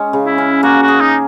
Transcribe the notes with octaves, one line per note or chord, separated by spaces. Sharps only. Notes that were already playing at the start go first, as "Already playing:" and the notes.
Already playing: G#3 C#4
C#3
E4
C#4
A#3 F#4
F#4
G#4
D#4